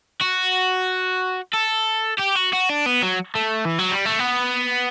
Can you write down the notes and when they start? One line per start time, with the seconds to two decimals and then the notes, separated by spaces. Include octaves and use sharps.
0.21 F#4
1.54 A4
2.19 G4
2.36 F#4
2.53 F#4
2.70 D4
2.86 B3
3.03 F#3
3.35 A3
3.65 E3
3.78 F#3
3.91 G3
4.05 A3
4.19 B3